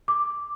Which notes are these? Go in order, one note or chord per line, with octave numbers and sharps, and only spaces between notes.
D6